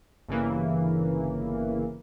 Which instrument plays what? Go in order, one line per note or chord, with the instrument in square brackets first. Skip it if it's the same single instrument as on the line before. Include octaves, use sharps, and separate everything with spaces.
[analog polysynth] G1 C#3 E3 A#3